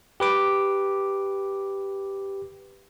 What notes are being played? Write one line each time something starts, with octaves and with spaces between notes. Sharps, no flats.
G4 B4 D6